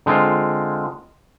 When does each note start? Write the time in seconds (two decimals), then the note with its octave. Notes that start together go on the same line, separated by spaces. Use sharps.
0.06 D3 G#3 C4 F4